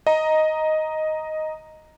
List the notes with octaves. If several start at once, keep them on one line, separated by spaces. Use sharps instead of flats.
D#5 A#5